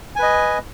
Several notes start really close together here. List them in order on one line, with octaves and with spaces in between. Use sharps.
G#5 B4 D#5